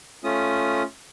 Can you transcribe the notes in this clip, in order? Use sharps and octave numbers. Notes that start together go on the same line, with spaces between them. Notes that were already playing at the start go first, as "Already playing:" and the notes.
A3 C#4 F4 D#6